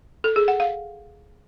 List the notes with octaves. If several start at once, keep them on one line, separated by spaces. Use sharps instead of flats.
A4
G#4
F#5
F5